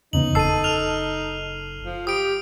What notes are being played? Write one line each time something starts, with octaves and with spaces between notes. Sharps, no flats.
E2 C#3 B3 D#4 F#7
F#1 A4 A5 E6 C7 D#7
F6 F7
F3
G4 D#6 D7